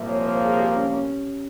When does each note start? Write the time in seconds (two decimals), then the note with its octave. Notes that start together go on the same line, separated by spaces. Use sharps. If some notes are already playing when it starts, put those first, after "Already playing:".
Already playing: C2 A#2 F3 A#3 E5
0.09 C#5
0.26 C5
0.42 G#4
0.60 G4
0.76 C#4
0.93 C#4